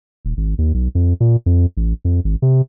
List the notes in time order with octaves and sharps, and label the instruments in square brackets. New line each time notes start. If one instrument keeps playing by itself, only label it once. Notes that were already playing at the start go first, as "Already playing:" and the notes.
[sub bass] D#1
G#1
D#2
B1
F2
A#2
F2
A1
F2
G#1
C3